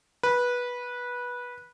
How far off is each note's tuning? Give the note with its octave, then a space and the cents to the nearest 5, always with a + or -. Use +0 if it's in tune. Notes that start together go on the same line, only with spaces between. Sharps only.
B4 -15